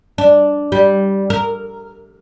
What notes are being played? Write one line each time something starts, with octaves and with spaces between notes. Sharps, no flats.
D4
G3
A#4